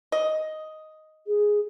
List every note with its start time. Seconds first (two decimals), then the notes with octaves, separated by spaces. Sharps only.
0.12 D#5
1.27 G#4